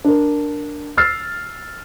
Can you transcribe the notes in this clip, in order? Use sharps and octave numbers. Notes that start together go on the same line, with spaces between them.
D4 A#4
E6 F6 A6 C7